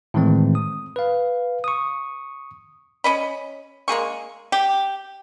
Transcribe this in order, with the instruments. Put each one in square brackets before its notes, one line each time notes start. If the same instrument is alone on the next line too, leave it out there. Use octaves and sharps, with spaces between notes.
[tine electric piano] A2 D#3 E3 G#3 C4
D#6
B4 F5
C#6 D#6
[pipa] C#4 D#5 B5
G#3 A#3 G#4 C#6
G4